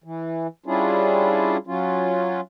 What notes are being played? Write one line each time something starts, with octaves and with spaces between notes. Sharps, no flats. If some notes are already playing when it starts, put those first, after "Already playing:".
E3
G3 C#4 D4 E4 F4 G#4
F#3 C#4 F4